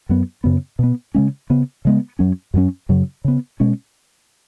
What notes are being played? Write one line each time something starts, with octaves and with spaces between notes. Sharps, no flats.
F#2 F#3 B3
F#2 C#3 B3
B2 B3
C#3 G#3 C#4
C#3 B3
C#3 G#3 B3
F#2 F#3 C#4
F#2 F#3 C#4
F#2 C#3 F#3
C#3 B3
B2 G#3 C#4